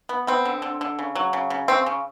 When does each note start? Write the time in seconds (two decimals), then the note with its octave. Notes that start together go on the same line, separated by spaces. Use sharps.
0.09 B3
0.27 B3 C4
0.45 D3
0.62 D3
0.81 D3
0.99 C#3
1.15 F#3
1.33 C#3
1.50 C#3
1.68 C#3 C4
1.86 C#3